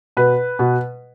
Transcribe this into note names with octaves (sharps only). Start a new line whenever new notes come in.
B2 B4
B2